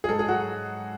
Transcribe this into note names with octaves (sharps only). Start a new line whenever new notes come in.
G#4
G#2 A4
G#4
F#3 F#4